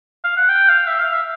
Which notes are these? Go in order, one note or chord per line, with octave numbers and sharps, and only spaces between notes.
F5
F#5
G5
F5
E5
F5
E5